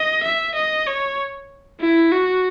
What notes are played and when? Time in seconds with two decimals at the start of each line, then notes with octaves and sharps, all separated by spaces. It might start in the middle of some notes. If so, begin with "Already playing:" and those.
Already playing: D#5
0.23 E5
0.55 D#5
0.87 C#5
1.81 E4
2.12 F#4